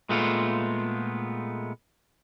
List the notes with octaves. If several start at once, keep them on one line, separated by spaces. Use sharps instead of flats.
A#2 G#3 A3 B3 F4